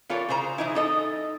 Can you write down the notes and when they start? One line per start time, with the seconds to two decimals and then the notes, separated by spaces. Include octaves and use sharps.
0.09 E3 F4 A4 A#4 C#5
0.29 C#3 G#4 C5 A#5
0.58 E3 D#4 E4
0.75 D#4 A4 D#5